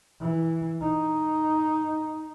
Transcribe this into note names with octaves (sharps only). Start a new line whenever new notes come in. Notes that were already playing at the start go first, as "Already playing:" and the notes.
E3
D#4